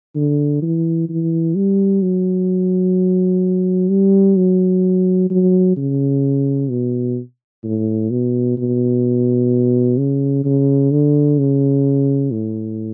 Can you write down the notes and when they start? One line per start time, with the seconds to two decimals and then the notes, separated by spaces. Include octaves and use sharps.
0.15 D3
0.62 E3
1.09 E3
1.55 G3
2.02 F#3
3.89 G3
4.36 F#3
5.30 F#3
5.77 C#3
6.70 B2
7.64 A2
8.11 B2
8.58 B2
9.98 C#3
10.44 C#3
10.91 D3
11.39 C#3
12.32 A2